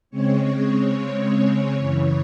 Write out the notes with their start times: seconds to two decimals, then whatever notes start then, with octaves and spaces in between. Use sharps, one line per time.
0.10 C#3 G#3 C4 C#5
1.75 F#2 C#3 E3 C#5